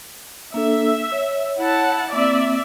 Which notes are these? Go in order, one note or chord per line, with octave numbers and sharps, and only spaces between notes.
A#3 D4 A4 E5
C#5
E4 F#5 A5
A#3 C4 D5 E5